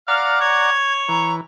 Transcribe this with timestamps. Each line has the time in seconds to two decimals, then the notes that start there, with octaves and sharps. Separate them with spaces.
0.08 D5 F5 F#5 A#5 F6
0.41 C#5 G#6
1.09 E3 A#5